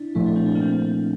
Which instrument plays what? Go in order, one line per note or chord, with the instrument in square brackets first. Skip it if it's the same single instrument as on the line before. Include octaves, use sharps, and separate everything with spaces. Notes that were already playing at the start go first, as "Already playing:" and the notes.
Already playing: [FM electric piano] D4 E4
[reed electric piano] A#2 F3 A3 [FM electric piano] E4
[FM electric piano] D4
C4
D4
A#3
C4